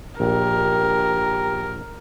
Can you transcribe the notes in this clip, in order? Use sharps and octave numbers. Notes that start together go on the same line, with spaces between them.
A#1 G4 A#4